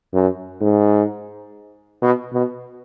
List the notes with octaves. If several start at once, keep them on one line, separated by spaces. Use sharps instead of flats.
F#2
G#2
B2
B2